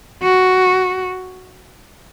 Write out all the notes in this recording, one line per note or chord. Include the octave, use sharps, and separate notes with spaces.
F#4